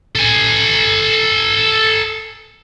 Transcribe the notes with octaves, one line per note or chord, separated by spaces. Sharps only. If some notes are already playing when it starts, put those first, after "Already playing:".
A4 G#5